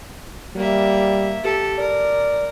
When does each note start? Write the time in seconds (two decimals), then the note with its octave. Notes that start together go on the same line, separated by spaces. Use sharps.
0.56 G3 A#3 E5
1.44 G4 A4
1.79 A#4 D5